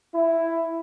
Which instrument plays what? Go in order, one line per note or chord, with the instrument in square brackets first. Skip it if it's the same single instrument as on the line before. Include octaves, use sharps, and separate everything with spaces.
[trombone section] E4